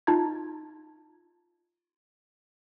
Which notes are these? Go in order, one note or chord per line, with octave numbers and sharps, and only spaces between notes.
D#4 F4 A5 A#5 G#6